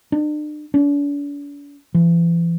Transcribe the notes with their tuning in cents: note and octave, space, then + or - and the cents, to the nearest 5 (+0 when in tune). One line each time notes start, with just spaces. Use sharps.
D4 +40
D4 -45
E3 +40